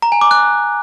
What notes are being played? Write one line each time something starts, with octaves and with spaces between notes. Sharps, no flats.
A#5
G#5
D6
F#6